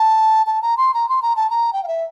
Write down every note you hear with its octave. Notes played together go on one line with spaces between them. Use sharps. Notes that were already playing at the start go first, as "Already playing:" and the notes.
Already playing: A5
A5
A#5
C6
A#5
C6
A#5
A5
A#5
G5
F5
E5